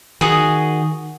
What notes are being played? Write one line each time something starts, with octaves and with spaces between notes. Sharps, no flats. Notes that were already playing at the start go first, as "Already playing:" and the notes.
D#3 F#4 G#4